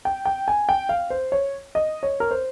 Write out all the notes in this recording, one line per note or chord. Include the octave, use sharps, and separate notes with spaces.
G5
G5
G#5
G5
F5
C5
C#5
D#5
C#5
A#4
C5